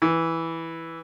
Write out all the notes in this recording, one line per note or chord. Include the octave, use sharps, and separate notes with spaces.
E3